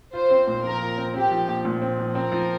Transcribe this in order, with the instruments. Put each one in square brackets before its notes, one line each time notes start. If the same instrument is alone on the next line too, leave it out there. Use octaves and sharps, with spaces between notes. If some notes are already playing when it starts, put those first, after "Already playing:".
[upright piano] F4 [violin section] C5
[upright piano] C4
A#2
[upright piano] F3 [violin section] A#4
[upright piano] F4
C4
[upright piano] C4 [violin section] G4
[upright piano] F3
A#1
A#2
C4
F3
[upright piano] C4 [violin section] A#4
[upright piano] F3